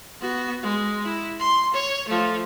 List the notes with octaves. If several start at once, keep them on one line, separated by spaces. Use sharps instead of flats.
B3 F#4
G#3
E4
C6
C#5
F3 A3